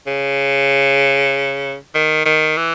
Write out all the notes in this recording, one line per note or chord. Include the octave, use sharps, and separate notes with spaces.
C#3
D#3
D#3
E3